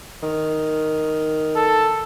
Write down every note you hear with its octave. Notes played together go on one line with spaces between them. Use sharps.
D#3
A4